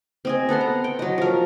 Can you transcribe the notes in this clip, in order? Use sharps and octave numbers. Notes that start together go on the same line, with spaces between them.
C4 D#5 G#5
B3 A4 F#5 C6
A#5
G5
F#3 D#5
F3 A#4